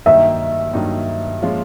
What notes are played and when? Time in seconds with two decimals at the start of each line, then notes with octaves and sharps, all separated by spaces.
0.06 G2 D#3 F#3 A#3 D#4 E5
0.73 G2 D#3 F#3 A#3 D#4
1.42 A#2 F3 G#3 C#4 F4